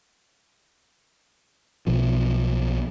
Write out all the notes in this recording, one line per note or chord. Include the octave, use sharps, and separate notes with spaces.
B1 B2 F3